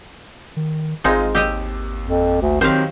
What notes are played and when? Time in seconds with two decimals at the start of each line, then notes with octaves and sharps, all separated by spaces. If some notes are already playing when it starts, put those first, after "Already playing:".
0.57 D#3
1.04 G#1 G#3 C4 D#4 F4 D#5
1.35 D#2 G4 D#5 G5 E6
2.06 F2
2.41 D2
2.61 D#3 F#3 C4 G4 C5 F5